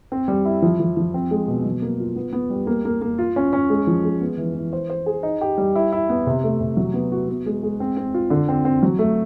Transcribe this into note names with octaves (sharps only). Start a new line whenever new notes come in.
C4
G3
E4
F3
F3
F3
C4
G#3
B2
F#3
A#3
F4
B3
B3
G3
A#3
A#3
A#3
F4
C#4
C#4
G#3
F3
G#3
B3
E3
E3
C5
C5
G#4
D#4
G4
G3
E4
E4
B3
C3
A3
C3
F#3
B3
F#4
B3
G#3
G#3
C4
C4
F4
D3
C4
C4
F#3
A3